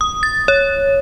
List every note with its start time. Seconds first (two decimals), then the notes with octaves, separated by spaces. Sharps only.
0.01 D#6
0.23 A6
0.48 C#5